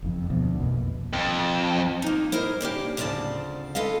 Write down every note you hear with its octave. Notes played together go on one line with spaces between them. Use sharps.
F#1 F2
D2 B2 F3 B3
A#1 F2 B2 A#3
F2
A#3 D#4
E4 A#4 C5 D#5
C#3 A#3 D4 G4
D2 C#3 F3 C4 D5 A5
F4 A4 B4 D#5 F5